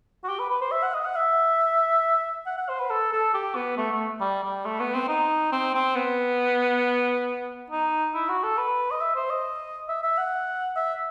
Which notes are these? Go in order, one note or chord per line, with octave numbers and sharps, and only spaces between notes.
F#4
G4
B4
B4
C5
E5
F#5
D#5
F#5
E5
F#5
F#5
C5
B4
A4
A4
G4
B3
A3
A3
G3
G3
A3
B3
C4
D#4
C4
C4
B3
D#4
E4
F#4
A4
B4
D#5
E5
C5
D#5
E5
E5
F#5
E5